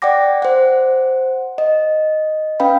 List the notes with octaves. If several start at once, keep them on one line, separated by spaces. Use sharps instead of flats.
D5 F#5 G5 D6 A#6
C5 F#5
D#5
C#4 B4 F5 G5 B5